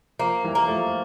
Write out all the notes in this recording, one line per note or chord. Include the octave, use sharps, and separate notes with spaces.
F3 A#3
E3 G3
A#3
F3 A3